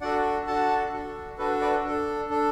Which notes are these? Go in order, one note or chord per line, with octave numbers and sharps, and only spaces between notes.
D4 F#4 A4 D5 F#5
D4 F#4 A4 F#5 A5
D4 F#4 A4
D4 F#4 A4 B4
B4 D5
D4 A4
D4 A4